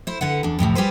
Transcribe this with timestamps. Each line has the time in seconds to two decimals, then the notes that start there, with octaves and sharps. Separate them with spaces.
0.07 E4 C5
0.21 D3 B4 F#5
0.43 E2 D4
0.59 F2 A2 C3 F3
0.75 G3 G4 G#4 B4 C5